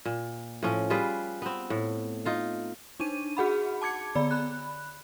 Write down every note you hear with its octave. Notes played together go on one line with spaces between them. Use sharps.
A#2
A2 F3 C#4
G3 F4 G#4 B4
B3 C4
A2
D#4 F4 F5
D4 D#4 D#7
F#4 G#4 F#5 B5
A5 D6 G#6 C#7
D3 B3 D5 B5
B5 F#6